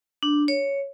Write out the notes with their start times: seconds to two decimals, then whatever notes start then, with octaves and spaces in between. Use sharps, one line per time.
0.23 D4
0.48 C#5